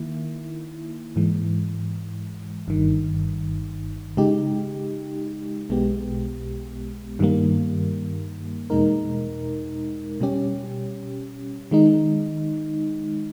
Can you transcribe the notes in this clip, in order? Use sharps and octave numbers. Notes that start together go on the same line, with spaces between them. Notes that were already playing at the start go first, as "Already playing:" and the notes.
Already playing: D#3 A#3 E4
G#2 E3 G#3
G1 G2 D#3
C#3 G#3 D#4 G4
B1 B2 G#3 B3 G4
G2 D#3 G3 A#3
E2 B2 G#3 D#4 A#4
B2 G3 C#4 G4
D#3 G#3 D#4